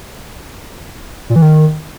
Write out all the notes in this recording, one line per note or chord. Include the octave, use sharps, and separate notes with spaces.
A#2
E3
D#3